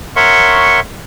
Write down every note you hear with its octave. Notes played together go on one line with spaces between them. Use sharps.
A#4 C#5 E5 F#5 C6 C#6